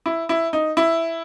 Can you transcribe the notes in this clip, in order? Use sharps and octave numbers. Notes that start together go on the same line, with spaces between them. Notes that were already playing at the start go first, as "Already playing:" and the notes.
E4
E4
D#4
E4